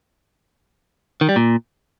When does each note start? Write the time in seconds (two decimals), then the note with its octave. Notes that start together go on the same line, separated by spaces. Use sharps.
1.21 D#3
1.29 G3
1.36 A#2